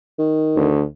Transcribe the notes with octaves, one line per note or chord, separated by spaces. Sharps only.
D#3
D2